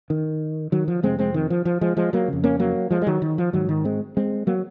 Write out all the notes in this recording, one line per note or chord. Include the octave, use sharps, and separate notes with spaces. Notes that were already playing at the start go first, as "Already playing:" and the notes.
D#3
D#3 F#3
F3
F2 C3 G#3 C4
G#3 C4
D#3
F3
F3
F3 G#3
F3 G#3
F#3 A#3
F2 C#3
A#3 C#4
F#3 A#3
F3 G#3
G#3
D#3 F#3
D#3
F3
G#2 D#3 F#3
D#3
G#3 C4
G#3 C4
F#3 A#3